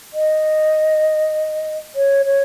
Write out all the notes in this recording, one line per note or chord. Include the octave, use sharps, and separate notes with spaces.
D#5
C#5
C#5